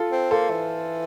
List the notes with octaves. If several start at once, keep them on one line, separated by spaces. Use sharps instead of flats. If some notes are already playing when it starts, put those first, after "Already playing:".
Already playing: F4 A4
C4
A#3 A4 C5
E3